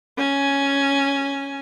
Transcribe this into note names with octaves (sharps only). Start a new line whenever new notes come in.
C#4 G#5